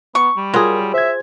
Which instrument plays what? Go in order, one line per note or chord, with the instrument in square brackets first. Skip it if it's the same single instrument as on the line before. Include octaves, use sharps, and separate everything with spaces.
[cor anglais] B3 [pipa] C#6
[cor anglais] G3
[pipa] F#3 [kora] F4 G#4 [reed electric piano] A#4
[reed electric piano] C5 G#6 [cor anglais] E5